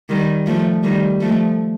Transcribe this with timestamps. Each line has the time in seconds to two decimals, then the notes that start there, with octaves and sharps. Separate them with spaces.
0.09 D#3 G3
0.46 F3 A3
0.83 D#3 G3
1.21 F3 A3